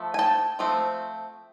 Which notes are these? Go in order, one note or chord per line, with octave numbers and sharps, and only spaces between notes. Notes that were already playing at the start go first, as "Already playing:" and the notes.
Already playing: F3 A3
G#5
G5 A5
F3 A3 C4